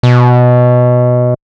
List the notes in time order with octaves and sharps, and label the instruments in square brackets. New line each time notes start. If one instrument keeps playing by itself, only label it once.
[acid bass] B2